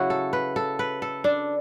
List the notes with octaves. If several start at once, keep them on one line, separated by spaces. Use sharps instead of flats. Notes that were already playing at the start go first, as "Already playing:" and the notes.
Already playing: C#3 F#3 E4 F#4
A4
B4
A4
B4
A4
D4